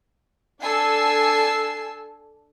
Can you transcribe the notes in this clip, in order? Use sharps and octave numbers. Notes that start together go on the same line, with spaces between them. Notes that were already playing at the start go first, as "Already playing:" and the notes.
D4 A4 G#5 E6 C7